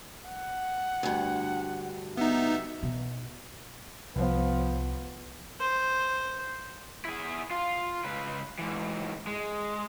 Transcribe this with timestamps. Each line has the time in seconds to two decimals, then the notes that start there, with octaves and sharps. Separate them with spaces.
0.25 F#5
1.03 D2 G2
2.17 B3 D#4 E5
2.83 B2
4.16 C2 F3 B3
5.60 C5
7.05 E4 G#4
7.51 F4
8.04 C#2 B4
8.59 G#2 E3
9.27 G#3